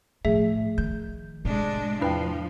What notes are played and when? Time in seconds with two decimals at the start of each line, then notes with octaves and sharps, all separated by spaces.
0.25 A2 F3 A3 G#4 E5
0.78 D#3 G6
1.45 A2 C3 G#3 D4
2.01 E2 F3 D4 E4 B4 G5